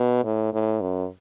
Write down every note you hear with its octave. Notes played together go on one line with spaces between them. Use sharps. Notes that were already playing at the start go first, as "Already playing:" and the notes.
Already playing: B2
A2
A2
F#2